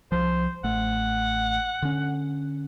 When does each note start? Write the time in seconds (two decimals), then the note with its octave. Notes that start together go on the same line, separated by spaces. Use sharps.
0.12 C2 F3 C5
0.64 A1 A3 F#5
1.82 D3 C#4